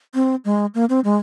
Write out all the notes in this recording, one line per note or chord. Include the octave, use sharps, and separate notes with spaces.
C4
G#3
A#3
C4
G#3